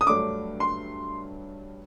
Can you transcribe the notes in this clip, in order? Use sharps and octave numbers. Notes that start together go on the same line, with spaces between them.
D#6
G2 F#3 A3 D4 D6
C6